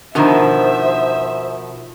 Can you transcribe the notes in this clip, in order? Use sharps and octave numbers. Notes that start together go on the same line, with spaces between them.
B2 D#3 F3 D4 C5 E5 A#5